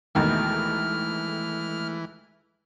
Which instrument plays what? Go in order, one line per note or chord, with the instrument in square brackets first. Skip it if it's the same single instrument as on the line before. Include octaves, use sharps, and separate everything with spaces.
[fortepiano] D#2 B2 D#3 [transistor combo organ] E3 [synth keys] G#3 A3 [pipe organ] F6